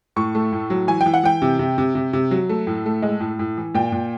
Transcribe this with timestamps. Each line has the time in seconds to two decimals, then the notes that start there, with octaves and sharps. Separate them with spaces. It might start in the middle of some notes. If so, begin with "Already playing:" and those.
0.16 A2 C#6
0.35 A3
0.52 A2
0.70 F#3
0.88 E3 G#5
1.01 G5
1.06 E3
1.14 F#5
1.23 E3 G5
1.42 C3
1.59 C3
1.78 C3
1.95 C3
2.13 C3
2.31 F#3
2.49 A3
2.67 A2
2.86 A3
3.02 G#3
3.20 A2
3.39 A2
3.57 E3
3.75 A#2 G5
3.92 A#2